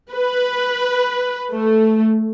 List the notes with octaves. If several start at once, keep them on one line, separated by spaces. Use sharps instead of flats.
B4
A3